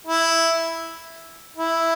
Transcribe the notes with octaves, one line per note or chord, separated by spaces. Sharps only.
E4
E4